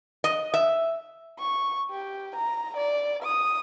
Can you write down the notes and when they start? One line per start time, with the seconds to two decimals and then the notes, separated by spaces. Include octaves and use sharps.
0.24 D#5
0.54 E5
1.39 C#6
1.91 G4
2.36 A#5
2.77 D5
3.23 D#6